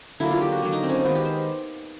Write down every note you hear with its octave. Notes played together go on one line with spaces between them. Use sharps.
D3 F#3 A#3 E4
F4
G4
F#4
D3 F#3 A#3
D#4
C4
C#4
C4
D#3 G#3 B3 F#4
G4
C5